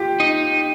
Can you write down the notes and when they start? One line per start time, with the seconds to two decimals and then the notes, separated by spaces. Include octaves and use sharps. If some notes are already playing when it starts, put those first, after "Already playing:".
Already playing: F4 G4
0.20 D#4